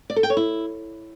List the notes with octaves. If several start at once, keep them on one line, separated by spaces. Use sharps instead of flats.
D5
A4
G5
C#5
E4